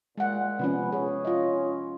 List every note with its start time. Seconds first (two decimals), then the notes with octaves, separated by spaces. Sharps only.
0.18 A#2 G#3 F#5
0.59 C3 F3 B3 C#4
0.93 C#4 G#4
1.25 F4 D#5